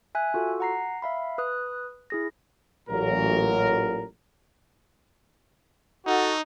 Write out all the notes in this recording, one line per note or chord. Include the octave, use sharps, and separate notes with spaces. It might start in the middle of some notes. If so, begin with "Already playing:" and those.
E5 G#5 F#6
F4 F#4 A4
F#5 A#5 C7
E5 F5 B5
B4 D#6 F#6
E4 G#4 A#6
A1 A#2 F#3 A#4
D#4 F#4 A4